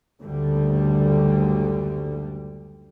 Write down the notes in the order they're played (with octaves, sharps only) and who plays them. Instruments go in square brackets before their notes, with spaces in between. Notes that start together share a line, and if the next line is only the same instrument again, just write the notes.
[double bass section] F#1 D2 D3 G3